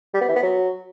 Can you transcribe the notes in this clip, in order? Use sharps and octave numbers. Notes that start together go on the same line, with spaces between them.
G3
B3
E3
B3
F#3